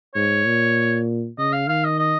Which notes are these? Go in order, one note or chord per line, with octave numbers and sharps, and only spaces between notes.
G#2 C#5
A#2
C#3 D#5
F5
D#3 F5
D#5
D#5